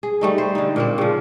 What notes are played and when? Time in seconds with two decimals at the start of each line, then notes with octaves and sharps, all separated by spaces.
0.03 G#4
0.21 G3 A3 D#4
0.38 C5
0.55 D3 D#4
0.76 A#2 A#3 C4
0.98 C#3 F3